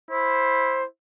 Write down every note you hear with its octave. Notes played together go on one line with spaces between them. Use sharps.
E4 C5